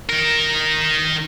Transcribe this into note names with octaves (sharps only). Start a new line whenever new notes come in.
D#3 A#4